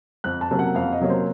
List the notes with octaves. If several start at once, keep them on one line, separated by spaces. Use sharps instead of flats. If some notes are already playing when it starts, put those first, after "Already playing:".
F2 F#6
A5
C3 F#3 A#3 C#4
F#5
F2 F5
D#5
C3 F#3 A#3 C#4
C5